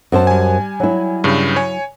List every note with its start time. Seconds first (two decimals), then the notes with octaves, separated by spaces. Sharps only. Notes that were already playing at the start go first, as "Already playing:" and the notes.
0.12 F#2 C5 A5
0.27 G3 G#5
0.80 F#3 E4
1.24 G2 C#3
1.56 C#5 G#5